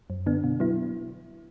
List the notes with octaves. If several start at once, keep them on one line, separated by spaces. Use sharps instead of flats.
F#2
D3 B3 D4
B2
F#3 B3 E4